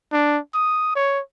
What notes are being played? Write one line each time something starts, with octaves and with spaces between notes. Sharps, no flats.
D4
D#6
C#5